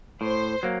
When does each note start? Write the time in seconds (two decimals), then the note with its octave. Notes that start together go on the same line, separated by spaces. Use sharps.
0.21 A2 C5
0.63 F#3 A#3